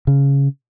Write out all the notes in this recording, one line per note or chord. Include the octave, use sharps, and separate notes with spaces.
C#3